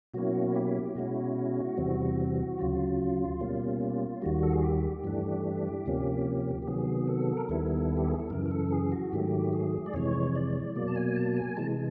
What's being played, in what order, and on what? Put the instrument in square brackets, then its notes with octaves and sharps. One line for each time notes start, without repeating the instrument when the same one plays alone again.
[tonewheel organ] B2 F#3 A#3 C#4 E4 F#4
G4
B2 G#3 C#4 E4 F#4
E2 C3 E3 G3 C4
D2 C#3 F#3 F4
B2 G3 A#3 C#4
D#2 D#3 G3 F#4
A4
G#4
G4
G2 E3 A3 D4
D2 C3 F3 A#3 C#4
G4
C3 D#3 F#3 B3 G#4
A4
A#4
D#2 D#3 G3 B3 E4 A4
G4
G#4
A4
F#2 C#3 E3 A#4
A#4
A4
G#4
F#4
G#2 D#3 F#3 A3 G4
G#4
D5
F2 C3 E3 G#3 C#5
D5
B2 F#3 A#3 D5
A5
G#5
A5
G#5
C3 E3 G#3 A5